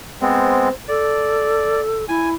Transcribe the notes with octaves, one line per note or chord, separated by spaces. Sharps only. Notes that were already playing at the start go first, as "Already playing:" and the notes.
G#3 B3 C4 C5
A4 D5
E4 G#5